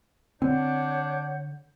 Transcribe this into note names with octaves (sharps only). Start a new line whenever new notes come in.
D3 C4 D4 C#5 F#5 G6